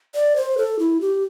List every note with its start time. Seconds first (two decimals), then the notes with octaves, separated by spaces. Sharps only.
0.15 D5
0.36 C5
0.58 A4
0.79 E4
1.01 G4